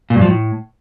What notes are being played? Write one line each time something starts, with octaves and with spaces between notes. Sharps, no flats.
A#2
G2
F3
A2